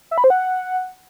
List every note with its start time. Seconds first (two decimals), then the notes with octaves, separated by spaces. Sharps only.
0.11 E5
0.18 B5
0.24 C5
0.30 F#5